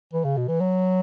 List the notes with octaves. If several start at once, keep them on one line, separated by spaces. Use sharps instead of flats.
E3
C#3
B2
E3
F#3